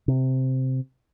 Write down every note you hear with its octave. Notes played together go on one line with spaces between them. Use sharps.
C3